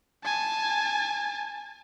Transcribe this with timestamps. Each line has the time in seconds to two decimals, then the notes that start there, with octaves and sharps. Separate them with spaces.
0.24 G#5 A5